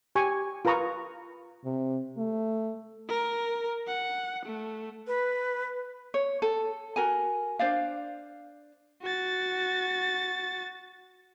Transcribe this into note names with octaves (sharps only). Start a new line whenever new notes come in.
G4 G#5 C#6
F4 A#4 B4 A#5 C#6 D#6
C3
A3
A#4
F#5
A3
B4
C#5
A4
F#4 A#4 G#5
D4 C5 D5 F5
F#4 A6